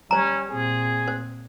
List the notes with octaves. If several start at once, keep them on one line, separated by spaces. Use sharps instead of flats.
G3 C#4 C5 A#5
A#2 C4 G#4
C5